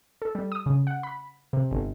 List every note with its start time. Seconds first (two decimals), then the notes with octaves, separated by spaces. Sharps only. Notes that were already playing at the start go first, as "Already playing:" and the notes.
0.22 A4
0.35 G3
0.52 D#6
0.66 C#3
0.87 F#5
1.03 B5
1.53 C3
1.71 G1